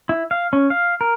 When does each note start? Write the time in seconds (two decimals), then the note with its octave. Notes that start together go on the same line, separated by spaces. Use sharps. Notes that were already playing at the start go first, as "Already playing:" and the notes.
0.09 E4
0.31 F5
0.53 C#4
0.70 F5
1.01 A#4